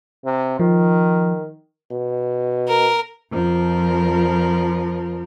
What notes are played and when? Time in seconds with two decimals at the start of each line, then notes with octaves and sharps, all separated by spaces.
0.25 C3
0.59 D#3 F3
1.91 B2
2.68 A#4
3.30 F2 F3 A#4